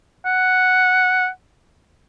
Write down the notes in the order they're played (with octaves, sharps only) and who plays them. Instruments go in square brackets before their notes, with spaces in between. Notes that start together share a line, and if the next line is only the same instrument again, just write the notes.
[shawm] F#5